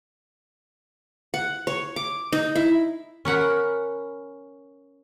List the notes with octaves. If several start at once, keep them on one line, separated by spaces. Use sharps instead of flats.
F#5
C#5
D6
D#4
E4
C#4 A#4 F#5 B5